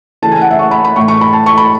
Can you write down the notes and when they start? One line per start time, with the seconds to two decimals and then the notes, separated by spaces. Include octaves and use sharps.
0.22 C#3 E3 A3 A5
0.32 G#5
0.41 F#5
0.51 E5
0.59 C#6
0.71 B5
0.84 B5
0.96 A2 E3 A3 C#6
1.08 C#6
1.21 B5
1.33 A5
1.46 C#6
1.58 B5